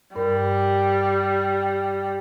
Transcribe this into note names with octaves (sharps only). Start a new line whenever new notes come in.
G2 G3 A#4